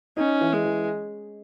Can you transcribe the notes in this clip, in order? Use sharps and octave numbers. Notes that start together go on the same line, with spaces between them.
C#4 D#4
E3
G#3
E3